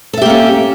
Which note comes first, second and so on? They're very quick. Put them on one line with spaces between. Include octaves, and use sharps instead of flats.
A4 E5 G4 A#3 C#4